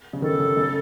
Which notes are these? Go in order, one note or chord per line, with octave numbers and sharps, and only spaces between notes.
C#3
D#3 A4
C#3
C#3